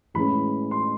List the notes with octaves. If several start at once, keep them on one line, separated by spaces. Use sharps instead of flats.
A2 E3 G#3 C#4 B5
C6